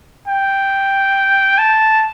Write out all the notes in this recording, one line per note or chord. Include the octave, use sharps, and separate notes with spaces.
G5
A5